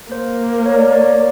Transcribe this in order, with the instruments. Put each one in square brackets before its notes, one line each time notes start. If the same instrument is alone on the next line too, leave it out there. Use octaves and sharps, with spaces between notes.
[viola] A#3 [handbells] C5
[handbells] C#5
D5
C#5
D5
C#5